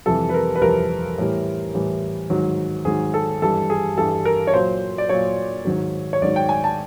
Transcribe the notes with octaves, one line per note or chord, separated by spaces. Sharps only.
F2 C3 E3 G3 A4
B4
A#4
B4
F2 C3 E3 G3 A#4
A2 E3 G3
A2 E3 G3
G#2 D#3 F#3
G#2 D#3 F#3 G#4
A4
G2 E3 G3 A4
G#4
G2 E3 G3 A4
A#4
C#5
A#2 F#3 C5
D5
A#2 F#3 C#5
G#2 D#3 F#3
C#5
G#2 D#3 F#3 D5
G5
G#5
A5